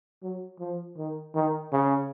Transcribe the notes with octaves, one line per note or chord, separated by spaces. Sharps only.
F#3
F3
D#3
D#3
C#3